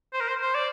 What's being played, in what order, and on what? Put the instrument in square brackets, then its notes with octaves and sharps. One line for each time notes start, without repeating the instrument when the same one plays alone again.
[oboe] C5
A#4
C5
C5
D5